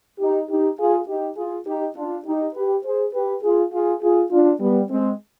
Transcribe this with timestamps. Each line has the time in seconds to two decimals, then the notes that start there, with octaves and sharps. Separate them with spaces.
0.19 D#4 G4
0.49 D#4 G4
0.79 F4 G#4
1.08 D#4 G4
1.37 F4 G#4
1.67 D#4 G4
1.96 D4 F4
2.26 D#4 G4
2.54 G4 B4
2.84 G#4 C5
3.14 G4 B4
3.43 F4 G#4
3.72 F4 G#4
4.02 F4 G#4
4.31 D4 F4
4.60 G3 B3
4.89 G#3 C4